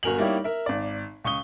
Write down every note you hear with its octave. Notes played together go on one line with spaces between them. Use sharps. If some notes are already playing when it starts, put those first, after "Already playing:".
G1 F#4 A#4 G#5 F7 F#7
G3 A#3 D#4 E4 G4 C#5
A#4 E5
G#1 D5
C#2 C#6 D#6 G7